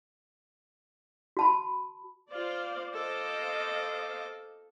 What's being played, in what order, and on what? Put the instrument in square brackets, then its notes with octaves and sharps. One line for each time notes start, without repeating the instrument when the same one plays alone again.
[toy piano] F#4 A5 B5
[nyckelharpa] F4 [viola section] C5 D5 F5
[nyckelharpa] A4 D6 [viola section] C5 D#5 F5